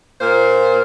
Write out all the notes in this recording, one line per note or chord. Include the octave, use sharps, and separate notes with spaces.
A#2 A#3 C5